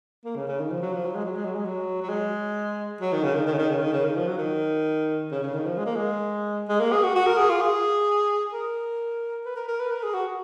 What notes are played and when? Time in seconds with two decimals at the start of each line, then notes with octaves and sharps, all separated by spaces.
0.25 A#3
0.36 C#3
0.47 C#3
0.60 D#3
0.70 F3
0.82 F#3
0.93 F3
1.05 F#3
1.15 G#3
1.25 F#3
1.35 G#3
1.45 F#3
1.55 G#3
1.65 F#3
2.02 F#3
2.09 G#3
3.01 F#3
3.13 D#3
3.23 C#3
3.35 D#3
3.47 D#3
3.53 C#3
3.58 D#3
3.70 C#3
3.81 D#3
3.92 C#3
4.04 D#3
4.16 F3
4.27 F#3
4.38 D#3
5.31 C#3
5.42 C#3
5.54 D#3
5.66 F3
5.77 G#3
5.86 A#3
5.96 G#3
6.68 G#3
6.80 A#3
6.92 G#4
7.03 F#4
7.16 F#4
7.27 A#4
7.37 G#4
7.49 F4
7.61 G#4
8.53 A#4
9.46 B4
9.56 A#4
9.68 A#4
9.80 B4
9.91 A#4
10.03 G#4
10.14 F#4